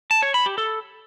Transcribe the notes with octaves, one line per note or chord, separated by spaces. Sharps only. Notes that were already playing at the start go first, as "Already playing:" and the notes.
A5
C#5
B5
G4
A4